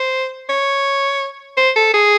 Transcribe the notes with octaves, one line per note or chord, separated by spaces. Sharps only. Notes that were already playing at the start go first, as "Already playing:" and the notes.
Already playing: C5
C#5
C5
A4
G#4